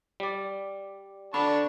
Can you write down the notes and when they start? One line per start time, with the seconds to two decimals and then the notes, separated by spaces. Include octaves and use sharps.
0.20 G3 D5
1.34 D3 D4 A5 B5 C#6